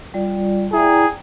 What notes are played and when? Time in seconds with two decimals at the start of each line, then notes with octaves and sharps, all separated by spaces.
0.14 G3 F4 D5
0.73 E4 G#4 D5 G5 A#5